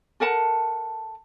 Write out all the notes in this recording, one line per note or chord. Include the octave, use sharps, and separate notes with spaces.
A4 A#4 F#5 A5